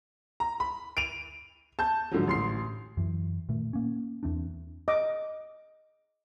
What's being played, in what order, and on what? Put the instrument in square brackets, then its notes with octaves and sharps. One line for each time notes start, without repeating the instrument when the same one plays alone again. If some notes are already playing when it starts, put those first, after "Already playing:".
[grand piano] A#5
B5
D7 D#7 F7
A5 G6
G#2 D3 F3 F#3
A1 C6 C7
[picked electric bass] F#2 E3
A#2 D#3 A3
A#3 C#4
E2 E3 C4 D4
[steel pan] D#5 D6